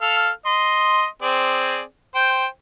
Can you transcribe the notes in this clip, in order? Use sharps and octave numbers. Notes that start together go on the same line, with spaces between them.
A4 F5 F6
D#5 C6
C4 G#4 D5
C5 G5